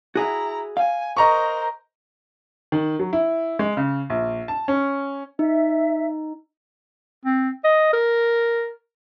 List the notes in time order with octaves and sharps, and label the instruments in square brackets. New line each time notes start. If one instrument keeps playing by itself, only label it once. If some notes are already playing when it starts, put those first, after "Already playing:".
[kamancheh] E4 A#5 [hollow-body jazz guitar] F#4 G#4 E5
[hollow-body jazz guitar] F5 [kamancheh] G#5
[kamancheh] A#4 C5 [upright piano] D#5 A#5 C#6
[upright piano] D#3
F#3
E4
G#3
C#3
A#1
A5
C#4
[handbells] D#4 [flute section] E5
[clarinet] C4
D#5
A#4